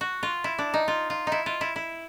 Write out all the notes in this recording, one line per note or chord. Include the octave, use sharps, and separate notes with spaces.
F#4
F4
E4
D4
D#4
F4
F4
D#4 E4
F4
E4
E4